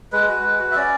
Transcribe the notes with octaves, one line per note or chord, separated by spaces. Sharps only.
G#3 B4
F#4
G#3
F#4
E5
C#4 D5